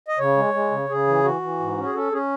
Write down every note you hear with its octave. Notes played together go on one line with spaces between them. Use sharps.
D#5
C#3 C#5
G#3
G#3
C#3
C#3 G#4
E3
E3 F#4
E3
G#2
C#4
G#4
C#4 A4
C#4 G#4